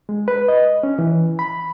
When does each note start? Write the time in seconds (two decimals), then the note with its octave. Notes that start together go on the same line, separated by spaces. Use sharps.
0.09 G#3
0.28 B4
0.48 D#5
0.83 C#4
0.99 E3
1.39 B5